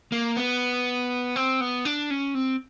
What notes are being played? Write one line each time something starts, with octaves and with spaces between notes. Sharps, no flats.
A#3
B3
C4
B3
D4
C#4
C4